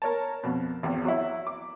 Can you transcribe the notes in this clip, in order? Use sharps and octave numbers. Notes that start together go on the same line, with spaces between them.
A#4 C#5 A5
F2 B2
G#1 E2
F#3 E4
D6